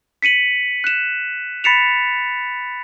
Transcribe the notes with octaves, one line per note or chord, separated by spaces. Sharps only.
B6 C#7 D#7 F#7
F#6 E7
B5 A6 B6 C#7 E7 F7